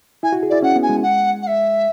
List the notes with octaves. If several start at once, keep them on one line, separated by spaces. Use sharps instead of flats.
E4 G#5
F#4
G#4
E4 D5
C#4 F#5
B3
G#5
G#3
F#5
F#5
E5